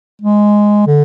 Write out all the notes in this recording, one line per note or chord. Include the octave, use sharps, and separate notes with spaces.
G#3
D3